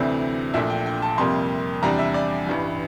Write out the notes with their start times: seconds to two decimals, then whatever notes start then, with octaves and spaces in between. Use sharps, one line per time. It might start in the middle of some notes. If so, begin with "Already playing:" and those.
Already playing: D2 C3 E3 A3 C4 D5
0.54 A#1 A#2 A3 D4 E5
0.70 G5
0.86 G5
1.02 A5
1.18 F2 C3 G3 A#3 C6
1.83 E2 C3 G3 D4 A#5
1.99 E5
2.14 D5
2.47 A1 G2 E3